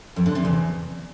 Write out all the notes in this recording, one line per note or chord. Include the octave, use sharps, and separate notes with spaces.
F2
D3
C3
E2